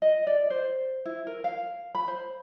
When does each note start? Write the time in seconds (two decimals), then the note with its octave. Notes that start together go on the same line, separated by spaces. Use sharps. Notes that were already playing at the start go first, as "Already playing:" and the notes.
0.02 D#5
0.27 D5
0.50 C5
1.05 E4
1.27 A#4
1.44 F5
1.95 B5
2.08 C5